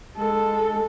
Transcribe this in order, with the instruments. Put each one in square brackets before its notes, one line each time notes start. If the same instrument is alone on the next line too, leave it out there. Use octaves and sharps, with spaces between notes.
[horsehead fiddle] G#3 A4